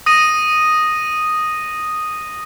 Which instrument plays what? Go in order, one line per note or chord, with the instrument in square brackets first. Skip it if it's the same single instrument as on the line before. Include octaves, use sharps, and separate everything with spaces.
[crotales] D#6 A#6 D#7